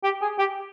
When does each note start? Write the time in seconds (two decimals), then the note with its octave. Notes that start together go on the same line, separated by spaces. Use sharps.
0.04 G4
0.22 G#4
0.38 G4